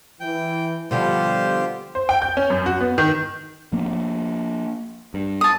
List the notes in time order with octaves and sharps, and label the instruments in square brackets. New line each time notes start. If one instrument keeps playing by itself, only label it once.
[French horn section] E3 [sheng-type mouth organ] G5
[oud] B2 D3 F3 [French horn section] G3 [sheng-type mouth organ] F4 G4 C5
[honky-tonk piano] C5
G5
G6
C#4
F#2
F#4
B3
D#3
[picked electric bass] F3 A#3 C#4
G2
[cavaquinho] A5 D#6